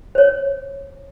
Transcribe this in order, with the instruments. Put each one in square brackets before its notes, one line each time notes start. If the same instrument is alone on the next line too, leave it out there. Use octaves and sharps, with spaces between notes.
[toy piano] C5 C#5